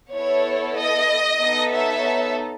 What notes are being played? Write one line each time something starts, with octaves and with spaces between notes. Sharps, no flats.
B3 E4 A4 C#5
D#5
B3 D#4 A4
C#5 E5